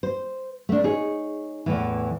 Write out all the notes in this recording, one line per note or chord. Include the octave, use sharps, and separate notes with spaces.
C5
A3 D4
D#4 G#4 C#5
E2 A2 E3